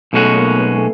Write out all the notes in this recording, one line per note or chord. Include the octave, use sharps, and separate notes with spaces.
B1 B2 G#3 A3 C#4 F#4
A#3
B3
A3